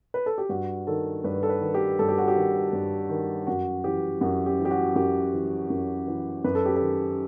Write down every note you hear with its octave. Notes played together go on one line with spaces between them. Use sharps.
B4
A4
G4
G2 F#4
D#3 A4
G2 B4
A4
B4
D#3
G4
G2 A4
G4
F#4
G4
D#3
G2
D#3
F#2 F#4
E3 G4
F#2 F#4
G4
E3
G4
F#4
F#2 G4
E3
F#2
E3
F#2 B4
A4
G4
A4
D#3